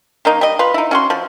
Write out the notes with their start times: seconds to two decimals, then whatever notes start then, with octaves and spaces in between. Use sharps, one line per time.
0.25 D#3 A#3 D#4
0.41 G3 D#5
0.59 F4 B4
0.74 D#4 E4
0.91 C#4 F#4 C6
1.10 F3